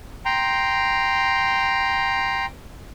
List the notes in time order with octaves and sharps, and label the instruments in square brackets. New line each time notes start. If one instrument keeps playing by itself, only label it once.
[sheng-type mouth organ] G5 A#5 C6